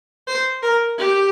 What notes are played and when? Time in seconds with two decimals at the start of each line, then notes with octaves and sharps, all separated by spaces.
0.27 C5
0.63 A#4
0.98 G4